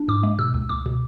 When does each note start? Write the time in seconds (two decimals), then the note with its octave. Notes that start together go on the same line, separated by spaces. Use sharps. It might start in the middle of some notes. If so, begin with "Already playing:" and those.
Already playing: D4
0.08 G#2 D6
0.23 G#3
0.39 B2 E6
0.54 C#2
0.69 C#2 D6
0.86 B2